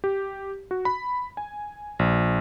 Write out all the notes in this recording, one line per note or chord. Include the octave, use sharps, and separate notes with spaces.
G4
F#4
B5
G#5
A#1